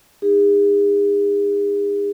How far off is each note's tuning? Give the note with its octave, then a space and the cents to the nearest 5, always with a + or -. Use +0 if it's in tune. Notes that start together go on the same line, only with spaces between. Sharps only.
D#4 +0 G#4 -40